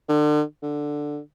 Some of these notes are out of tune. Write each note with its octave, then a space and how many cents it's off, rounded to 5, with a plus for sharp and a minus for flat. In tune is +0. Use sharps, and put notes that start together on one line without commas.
D3 +35
D3 +5